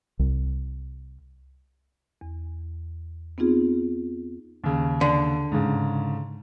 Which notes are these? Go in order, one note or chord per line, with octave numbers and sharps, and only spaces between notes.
C2
E2
B3 C4 D#4 F4 G#4
D#2 C#3
D3
G#2 C#3